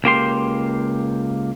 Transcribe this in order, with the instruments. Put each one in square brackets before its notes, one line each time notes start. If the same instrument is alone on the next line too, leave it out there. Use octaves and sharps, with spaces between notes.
[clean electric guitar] C#2 A#3 G4 C6